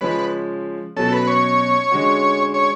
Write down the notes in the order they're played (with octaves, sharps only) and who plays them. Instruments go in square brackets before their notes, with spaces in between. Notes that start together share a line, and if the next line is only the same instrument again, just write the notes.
[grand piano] C#3 F3 G#3 C#4 [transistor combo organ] B4
[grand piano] B2 F#3 C#4 [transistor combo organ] A4
[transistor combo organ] B4
C#5
[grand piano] D3 G#3 C#4 F#4
[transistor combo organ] C#5